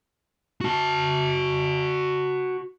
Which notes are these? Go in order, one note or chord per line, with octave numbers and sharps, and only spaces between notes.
F#4 A5